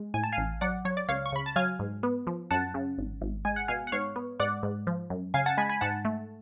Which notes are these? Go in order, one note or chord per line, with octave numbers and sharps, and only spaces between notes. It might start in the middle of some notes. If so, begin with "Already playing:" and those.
Already playing: G#3
A2 G#5
A5
A1 F5 G#5
F#3 D5 F#5
F#3 C#5
D5
C#2 C#5 F5
C#6
C#3 B5
A5
F#3 F5 G#5
G#2
B3
F3
F#2 F#5 A5
C#3
G#1
G#1
G#3 G#5
F#5
B2 F5 G#5
F#5
G#2 C#5 F5
B3
G#2 D5 F#5
G#2
F3
F#2
C#3 F5 G#5
F#5 A5
G#3 G#5 B5
G#5 B5
G#2 F#5 A5
A3